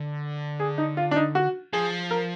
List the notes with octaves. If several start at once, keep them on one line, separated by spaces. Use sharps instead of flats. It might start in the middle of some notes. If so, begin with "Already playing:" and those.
Already playing: D3
G#4
D#4
F4
D4
D#4
F#4
F3 G#4
A#4